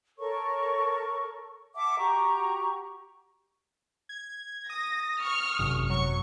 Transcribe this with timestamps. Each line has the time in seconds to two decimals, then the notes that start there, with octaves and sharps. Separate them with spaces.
0.18 A4 A#4 C#5 C#6
1.75 E5 F#5 A5 D6
1.98 F#4 G4 A#5 C#6
4.09 G#6
4.70 D#6 A#6
5.23 C#6 F6
5.59 G#1 F#2 C3
5.89 F#3 C#6